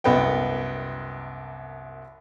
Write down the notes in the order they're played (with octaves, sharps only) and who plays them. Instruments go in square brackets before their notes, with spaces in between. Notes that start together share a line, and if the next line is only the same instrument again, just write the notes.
[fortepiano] C2 F#2 B3 D#5 G5